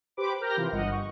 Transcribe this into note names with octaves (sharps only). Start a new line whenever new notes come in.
G4 B4 C5 B5 D6
G4 A#4 F6 G6 A#6
C3 E3 F4
G1 D#5 F#5
C#6